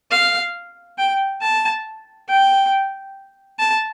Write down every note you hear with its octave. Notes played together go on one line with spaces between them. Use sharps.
F5
G5
A5
G5
A5